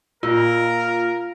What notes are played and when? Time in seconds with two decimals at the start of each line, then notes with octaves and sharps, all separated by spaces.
0.23 A#2 F4 A#4